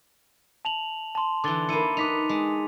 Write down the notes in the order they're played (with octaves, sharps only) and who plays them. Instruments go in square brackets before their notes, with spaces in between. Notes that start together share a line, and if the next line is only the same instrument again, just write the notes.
[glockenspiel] A5 F7 F#7
A5 C6
[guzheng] D3 E3 [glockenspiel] D6 A6 G7
[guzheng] A#3 E4 [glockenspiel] C#7 D#7
[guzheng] D#4 B4 [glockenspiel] D6 B6 F7
[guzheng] G#3